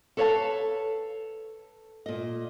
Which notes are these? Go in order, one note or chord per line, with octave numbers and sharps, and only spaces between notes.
A4 B4 C#5 D5 F5 A5
A#2 D#5